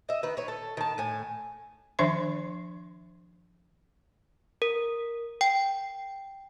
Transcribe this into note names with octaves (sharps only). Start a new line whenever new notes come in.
D#5 E5
D#3 B4
B4 C#5
A4
D#3 A5
A2 G#5
D#3 F3 D4 C5 E5 C6
A#4
G5